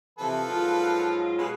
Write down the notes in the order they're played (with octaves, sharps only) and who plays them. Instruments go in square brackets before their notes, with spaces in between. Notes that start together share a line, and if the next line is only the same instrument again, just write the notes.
[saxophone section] C3 E3 [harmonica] F3 A4 B4
[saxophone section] G#2 F#3 F4
[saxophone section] B2 G#3 G#4 [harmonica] B4